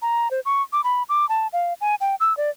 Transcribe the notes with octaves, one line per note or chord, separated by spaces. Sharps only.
A#5
C5
C#6
D6
B5
D6
A5
F5
G#5
G5
E6
D5